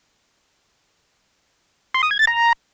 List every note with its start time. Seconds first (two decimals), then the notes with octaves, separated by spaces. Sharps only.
1.94 C6
2.03 D#6
2.11 G#6
2.19 A6
2.27 A#5